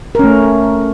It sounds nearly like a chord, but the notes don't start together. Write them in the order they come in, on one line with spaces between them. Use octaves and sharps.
A#4 C#4 A3